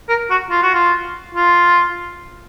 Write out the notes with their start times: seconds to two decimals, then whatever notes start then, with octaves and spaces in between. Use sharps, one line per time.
0.09 A#4
0.30 F#4
0.50 F4
0.62 F#4
0.74 F4
1.35 F4